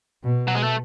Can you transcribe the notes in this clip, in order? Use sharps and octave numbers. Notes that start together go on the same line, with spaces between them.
B2
F#3
G#3
A3